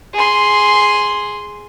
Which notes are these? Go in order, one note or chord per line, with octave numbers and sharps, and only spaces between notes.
G#4 C6